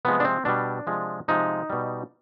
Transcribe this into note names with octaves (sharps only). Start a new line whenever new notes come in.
C3 F3 G#3 B3
D4
C4
B2 G3 D4
C3 F3 G#3
C3 F3 G#3 D#4
B2 G3